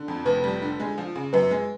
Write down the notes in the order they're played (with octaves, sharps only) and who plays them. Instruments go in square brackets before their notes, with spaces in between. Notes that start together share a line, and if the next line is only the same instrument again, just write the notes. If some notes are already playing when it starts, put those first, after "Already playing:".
Already playing: [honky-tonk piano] D3
F2
[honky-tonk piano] F1 [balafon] B4
[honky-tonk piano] G3
D3
G#3
F3
C#3
[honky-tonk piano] F#2 [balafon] B4
[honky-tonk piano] G#3